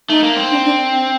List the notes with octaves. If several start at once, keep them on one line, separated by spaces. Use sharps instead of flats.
A3 D#4
A#3
C4
D4
D4